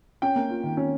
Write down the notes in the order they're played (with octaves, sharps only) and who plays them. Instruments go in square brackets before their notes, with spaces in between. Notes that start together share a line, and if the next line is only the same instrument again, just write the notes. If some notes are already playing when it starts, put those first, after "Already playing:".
[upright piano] C#4 [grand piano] G5
[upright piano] A#3
F4
D#3
C#4